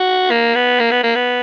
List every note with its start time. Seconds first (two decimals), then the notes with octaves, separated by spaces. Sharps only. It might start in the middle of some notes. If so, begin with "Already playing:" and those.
Already playing: F#4
0.31 A#3
0.55 B3
0.80 A#3
0.91 B3
1.03 A#3
1.15 B3